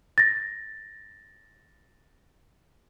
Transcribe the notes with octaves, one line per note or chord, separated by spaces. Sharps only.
A6 A#6